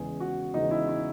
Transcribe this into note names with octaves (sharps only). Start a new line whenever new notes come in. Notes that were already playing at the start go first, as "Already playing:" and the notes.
Already playing: E2 C#3 E3 G#3 G#4
F#4
E2 C#3 E3 G#3 D#4
E4
E4